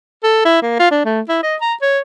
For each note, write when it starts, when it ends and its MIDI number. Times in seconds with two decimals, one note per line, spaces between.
0.23 0.41 69
0.45 0.61 64
0.62 0.75 58
0.80 0.88 65
0.91 1.03 62
1.05 1.21 57
1.29 1.40 64
1.43 1.56 75
1.61 1.74 82
1.82 1.99 73